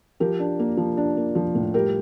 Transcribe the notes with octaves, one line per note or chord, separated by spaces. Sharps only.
F3 G4 A#4
D4
A#3
F3
D4
A#3
F3
A2
G3 G4 A#4